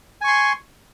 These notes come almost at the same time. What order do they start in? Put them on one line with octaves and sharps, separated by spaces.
G#5 C#6 C6